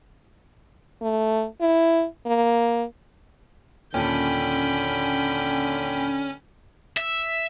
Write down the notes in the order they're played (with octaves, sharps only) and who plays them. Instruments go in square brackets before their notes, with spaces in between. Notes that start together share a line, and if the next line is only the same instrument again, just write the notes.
[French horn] A3
E4
A#3
[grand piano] D#2 A#2 A4 [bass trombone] D3 [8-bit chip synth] C#4 [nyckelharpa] G5 B5
[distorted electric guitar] E5